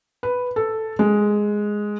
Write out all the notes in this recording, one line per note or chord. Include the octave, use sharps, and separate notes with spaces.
B4
A4
G#3